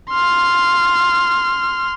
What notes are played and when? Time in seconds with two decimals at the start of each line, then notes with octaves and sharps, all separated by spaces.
0.10 C6 F6